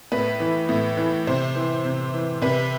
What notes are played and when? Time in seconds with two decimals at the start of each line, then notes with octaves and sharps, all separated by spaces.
0.12 A2 B4
0.40 E3
0.69 A2
0.97 E3
1.27 C3 C5
1.55 E3
1.85 C3
2.14 E3
2.42 C3 B4